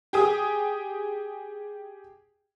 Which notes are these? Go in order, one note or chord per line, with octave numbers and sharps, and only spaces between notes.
G4 G#4 G#5 D#6